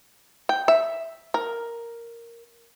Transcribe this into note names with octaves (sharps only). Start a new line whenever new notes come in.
G5
E5
A#4